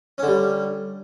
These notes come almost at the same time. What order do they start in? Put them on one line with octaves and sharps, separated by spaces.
C#4 D3 G3